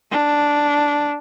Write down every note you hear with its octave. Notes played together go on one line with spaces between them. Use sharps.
D4